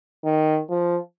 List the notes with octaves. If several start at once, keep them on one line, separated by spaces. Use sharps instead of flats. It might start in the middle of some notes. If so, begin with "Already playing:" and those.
D#3
F3